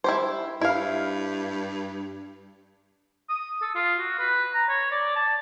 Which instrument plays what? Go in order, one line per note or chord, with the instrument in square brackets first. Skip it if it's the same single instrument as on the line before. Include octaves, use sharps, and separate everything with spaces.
[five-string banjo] E4 G4 C5
[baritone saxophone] G2 [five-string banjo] E4 F5
[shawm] D#6
A4
F4
F#4
B4
A#5
C#5
D5
A5